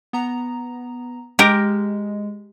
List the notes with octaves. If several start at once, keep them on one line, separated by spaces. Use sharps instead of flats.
B3 A#5
G#3 G4 A#4